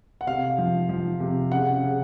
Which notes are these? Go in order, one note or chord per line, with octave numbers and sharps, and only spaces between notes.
F#5
C3 F5
F3
F3
C3
C#3 F#5
C#3